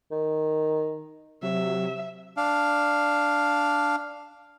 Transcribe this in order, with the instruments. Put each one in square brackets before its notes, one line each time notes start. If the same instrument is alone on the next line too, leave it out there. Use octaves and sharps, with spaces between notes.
[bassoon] D#3
[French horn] C3 [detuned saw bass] F#3 [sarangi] E5
[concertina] D4 F5